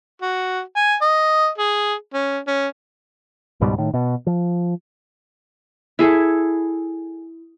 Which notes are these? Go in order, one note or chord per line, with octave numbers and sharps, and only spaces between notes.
F#4
G#5
D#5
G#4
C#4
C#4
C#2 G#2 B2 G3
A2 D#3
B2
F3
E4 G#4 A4